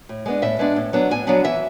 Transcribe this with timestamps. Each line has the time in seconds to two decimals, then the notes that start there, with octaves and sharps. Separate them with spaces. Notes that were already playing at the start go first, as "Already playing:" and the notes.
0.09 A2
0.26 G#3 B3 D4
0.42 A2 E5
0.59 G#3 B3 D4
0.76 A2
0.93 F#3 B3 D4
1.11 A2 G#5
1.27 F#3 B3 D4
1.44 E3 E5